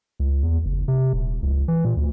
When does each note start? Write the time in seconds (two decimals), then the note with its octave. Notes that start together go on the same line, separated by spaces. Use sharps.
0.20 C#2
0.43 E2
0.65 F#1
0.88 C3
1.13 D#1
1.43 C#2
1.68 E3
1.85 A#2
1.97 D2